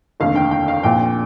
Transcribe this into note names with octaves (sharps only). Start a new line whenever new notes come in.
F1 D#2 D3 F5
G5
G5
F5
A#1 A#2 F3 G5